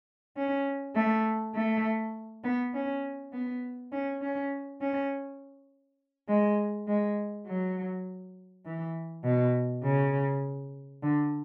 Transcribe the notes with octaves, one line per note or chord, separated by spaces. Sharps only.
C#4
A3
A3
B3
C#4
B3
C#4
C#4
C#4
G#3
G#3
F#3
E3
B2
C#3
D3